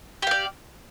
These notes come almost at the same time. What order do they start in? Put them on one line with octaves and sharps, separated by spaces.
G4 F5 D5